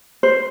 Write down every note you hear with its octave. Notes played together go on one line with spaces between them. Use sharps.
C5